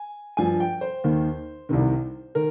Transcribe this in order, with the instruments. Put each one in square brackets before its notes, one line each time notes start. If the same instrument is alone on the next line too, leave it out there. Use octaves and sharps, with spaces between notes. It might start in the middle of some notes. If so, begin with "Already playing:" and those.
Already playing: [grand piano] G#5
G2 F3 G#5
G5
C5
D#2 D#3
C2 C3 D#3
D#3 A#4